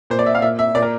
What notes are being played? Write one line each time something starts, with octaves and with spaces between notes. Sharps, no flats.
A#2 C5
D5
E5
F5
A#2 E5
E5
A#2 D5
A#4